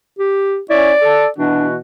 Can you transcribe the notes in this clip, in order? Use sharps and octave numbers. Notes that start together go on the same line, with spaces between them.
G4
C#4 E4 C#5 D5
A4
B2 E3 D4 F#4